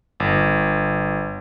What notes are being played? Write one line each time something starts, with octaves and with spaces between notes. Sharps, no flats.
G1